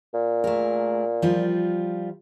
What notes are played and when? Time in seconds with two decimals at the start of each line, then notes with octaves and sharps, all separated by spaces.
0.14 A#2
0.44 A3 G#4 A#4
1.22 F3 G3 F4